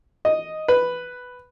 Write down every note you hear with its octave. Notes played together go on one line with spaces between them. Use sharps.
D#5
B4